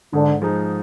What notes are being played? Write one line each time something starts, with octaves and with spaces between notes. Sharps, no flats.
G#2 D3
F3 G#3 D#4